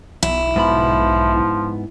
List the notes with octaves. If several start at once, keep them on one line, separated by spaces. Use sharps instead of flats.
B1 E4
G#2 F3 B3 B5